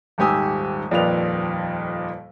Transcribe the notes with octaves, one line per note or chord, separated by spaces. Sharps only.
D#1 G#2 G4 G#5 D#6 E6
D#1 F2 A#2 B4 D5 F7